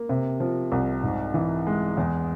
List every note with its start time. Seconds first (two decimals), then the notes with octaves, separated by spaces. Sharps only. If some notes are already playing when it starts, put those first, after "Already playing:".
Already playing: A#3
0.09 C3
0.40 F3
0.72 C2
1.03 G#2
1.34 E3
1.67 G#3
1.97 E2